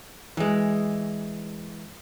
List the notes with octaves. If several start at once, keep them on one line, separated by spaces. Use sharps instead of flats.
E3 G#3